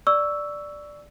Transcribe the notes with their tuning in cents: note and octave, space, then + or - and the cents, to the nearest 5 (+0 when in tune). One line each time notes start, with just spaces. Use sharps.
D5 +0 C#6 +25 E6 +0